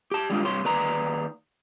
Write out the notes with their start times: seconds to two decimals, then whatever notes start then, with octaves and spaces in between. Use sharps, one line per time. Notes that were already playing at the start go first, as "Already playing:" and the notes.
0.11 G4 A5
0.30 G3 G#3 D4 F4
0.44 G2 C3 C#5 C6
0.65 D#2 B4 D5 A#5